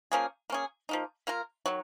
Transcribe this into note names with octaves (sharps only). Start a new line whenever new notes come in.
F3 A#3 C#4 G#4
A#3 C#4 G#4
F3 A#3 D#4
A#3 F4 A#4
D#3 F#3